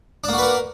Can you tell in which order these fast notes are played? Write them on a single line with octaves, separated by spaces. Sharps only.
D4 A#3 F#4 B4 A#4